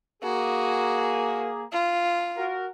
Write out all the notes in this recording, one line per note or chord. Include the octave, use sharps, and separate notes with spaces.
A#3 F#4 G#4
F4
F#4 A#4